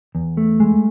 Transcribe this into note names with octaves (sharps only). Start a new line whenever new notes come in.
E2
A3
G#3